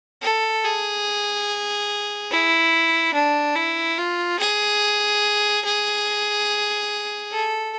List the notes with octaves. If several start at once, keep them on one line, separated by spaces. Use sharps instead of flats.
A4
G#4
E4
D4
E4
F4
G#4
G#4
A4